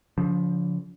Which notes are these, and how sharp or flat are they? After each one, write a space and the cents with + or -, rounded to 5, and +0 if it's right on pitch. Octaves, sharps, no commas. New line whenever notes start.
D3 -45 F3 +15